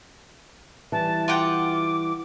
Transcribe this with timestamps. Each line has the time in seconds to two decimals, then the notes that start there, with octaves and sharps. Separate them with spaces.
0.92 E3 G3 A5
1.28 F4 F#5 G5 D6